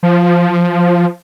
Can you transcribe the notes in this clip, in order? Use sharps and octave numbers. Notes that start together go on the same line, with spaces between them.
F3